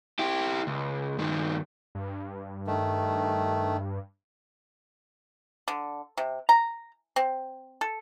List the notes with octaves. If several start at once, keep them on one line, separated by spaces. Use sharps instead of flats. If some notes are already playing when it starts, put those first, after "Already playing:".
E4 G4
C#2
G2 D#3
G2
D#3 A3
D3
C3
A#5
C4
A4